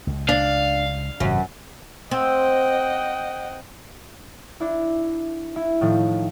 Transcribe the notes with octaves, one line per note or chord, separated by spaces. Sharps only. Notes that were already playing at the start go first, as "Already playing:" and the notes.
C#2
D4 F5
G#1 F#2 C3 G#3
C4 D#5 F#5 G5
D4 E4
E4
A2 D#3 F3